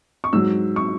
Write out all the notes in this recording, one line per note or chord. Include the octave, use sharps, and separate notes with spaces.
C#6
G#2 F#3 E6
C#6